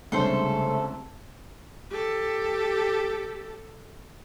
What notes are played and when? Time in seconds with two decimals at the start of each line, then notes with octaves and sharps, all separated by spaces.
0.12 C2 C#3 G#3 A3 D4 A4 C5
1.90 G4 A4